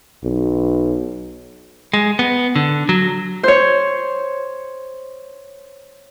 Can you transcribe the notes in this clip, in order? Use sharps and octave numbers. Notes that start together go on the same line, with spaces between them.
B1
G#3
B3
D3
F#3
C5 C#5